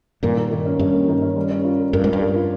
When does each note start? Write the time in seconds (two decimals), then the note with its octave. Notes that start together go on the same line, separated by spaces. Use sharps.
0.23 G2 A#2 D#3
0.37 D#3
0.51 D#3
0.65 C#4
0.79 G2 C#4
0.94 A#3
1.08 D#3
1.22 C#4
1.36 G3
1.51 C#4
1.64 F4
1.80 A#4
1.93 G2 A#4
2.04 G#2 G3
2.13 G2
2.22 A#4
2.36 F4